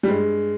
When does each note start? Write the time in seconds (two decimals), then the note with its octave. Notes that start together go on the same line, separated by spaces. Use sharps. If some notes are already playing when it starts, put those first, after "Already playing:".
0.03 G3
0.08 G2 G#3